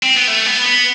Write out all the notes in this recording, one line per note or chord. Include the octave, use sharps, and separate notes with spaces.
C4
B3
A3
B3
B3